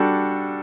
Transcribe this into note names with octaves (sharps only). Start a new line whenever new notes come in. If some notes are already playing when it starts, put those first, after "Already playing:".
Already playing: G3 D4 F#4 A4